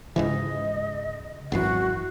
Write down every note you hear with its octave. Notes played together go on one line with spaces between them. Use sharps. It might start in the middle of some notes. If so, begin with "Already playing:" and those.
C#2 G#2 C#3 E3 D#5
G#1 F#2 E3 F#4 F#5 C7